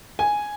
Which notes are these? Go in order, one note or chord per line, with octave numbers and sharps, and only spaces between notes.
G#5